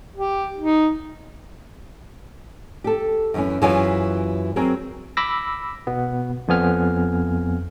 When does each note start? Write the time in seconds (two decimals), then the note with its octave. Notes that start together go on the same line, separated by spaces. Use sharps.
0.16 G4
0.57 D#4
2.84 G4 A4
3.34 F#2 E3 C#4
3.62 F#2 E3 F4 G#4 C#5 G#5
4.56 F#3 C4 G#4 A#4
5.17 B5 D6 E6 A#6
5.87 B2 B3
6.48 F2 F3 B3 G#5 F6